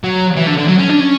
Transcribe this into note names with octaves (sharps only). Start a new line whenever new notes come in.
F#3
E3
D3
D3
F#3
C#4
D4
C#4